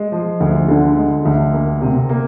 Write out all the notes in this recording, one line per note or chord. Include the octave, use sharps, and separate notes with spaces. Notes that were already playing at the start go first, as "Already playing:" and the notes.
Already playing: G#3
F3
D2
D3
G#3
D2
A#3
C3
A#3